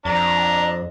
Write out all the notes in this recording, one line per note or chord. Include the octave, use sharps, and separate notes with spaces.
F2 D4 A#5